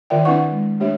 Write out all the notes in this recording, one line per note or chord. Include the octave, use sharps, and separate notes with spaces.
D#3 F4 A#4 D5 E5 G5
C4 D4 E4 B4 F#5 C#6
G#3
A3 D4 G4 C#5 E5